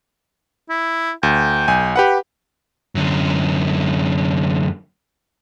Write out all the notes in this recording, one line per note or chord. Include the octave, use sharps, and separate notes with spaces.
E4
D2 G5
B1 G#5
G4 B4 F#5
F#2 D3